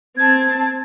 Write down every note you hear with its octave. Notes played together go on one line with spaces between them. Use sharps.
C4 A5 G#6